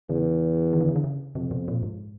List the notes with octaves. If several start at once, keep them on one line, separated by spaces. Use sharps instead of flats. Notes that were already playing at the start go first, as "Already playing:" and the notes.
E2 C#3
D#3
D3
C#3
D3
C#3
F2 C3
B2
A#2
G#2